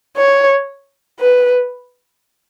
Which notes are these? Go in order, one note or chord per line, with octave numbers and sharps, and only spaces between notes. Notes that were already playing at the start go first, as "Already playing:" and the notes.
C#5
B4